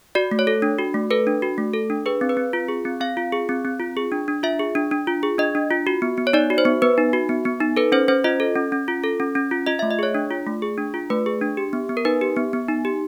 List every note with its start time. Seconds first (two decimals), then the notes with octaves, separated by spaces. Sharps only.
0.15 F#4 D5
0.31 A3
0.39 C#5
0.47 A4
0.62 D4
0.79 F#4
0.94 A3
1.11 A4 B4
1.27 D4
1.42 F#4
1.58 A3
1.74 A4
1.90 D4
2.06 G#4 B4
2.21 C4
2.29 B4
2.37 C4
2.53 F4
2.69 G#4
2.85 C4
3.01 C4 F5
3.17 F4
3.32 G#4
3.49 C4
3.65 C4
3.80 F4
3.97 G#4
4.12 D4
4.28 D4
4.43 F4 E5
4.59 G#4
4.75 D4
4.91 D4
5.07 F4
5.23 G#4
5.38 D4 D#5
5.55 D4
5.71 F4
5.87 F#4
6.02 B3
6.17 B3
6.27 C#5
6.33 D#4 D5
6.50 F#4
6.58 C5
6.65 B3
6.82 B3 B4
6.98 D#4
7.13 F#4
7.29 B3
7.45 B3
7.60 D#4
7.77 A4 B4
7.92 C#4 C5
8.08 C#4 C5
8.24 F4 D#5
8.40 A4
8.55 C#4
8.72 C#4
8.88 F4
9.04 A4
9.20 C#4
9.35 C#4
9.51 F4
9.66 F4 D#5
9.79 E5
9.82 A3
9.91 D#5
9.99 G#4 C#5
10.14 D4
10.31 F4
10.47 A3
10.62 G#4
10.78 D4
10.94 F4
11.10 A3 B4
11.26 G#4
11.42 D4
11.57 G4
11.73 B3
11.89 B3
11.97 A#4
12.05 D#4 B4
12.21 G4
12.36 B3
12.53 B3
12.68 D#4
12.85 G4